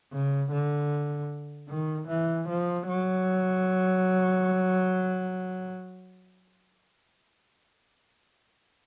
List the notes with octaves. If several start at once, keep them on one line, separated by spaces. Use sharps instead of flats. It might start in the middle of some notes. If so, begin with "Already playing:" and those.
C#3
D3
D#3
E3
F3
F#3